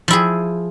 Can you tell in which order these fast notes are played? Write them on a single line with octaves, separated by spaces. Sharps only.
F3 E4 G#4